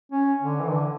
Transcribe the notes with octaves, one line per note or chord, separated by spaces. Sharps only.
C#4
D3
E3
D3